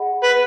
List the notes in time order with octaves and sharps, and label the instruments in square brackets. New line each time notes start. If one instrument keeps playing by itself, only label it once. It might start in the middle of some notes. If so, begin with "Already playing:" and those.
Already playing: [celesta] G#4 D#5 F#5 B5
[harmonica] B4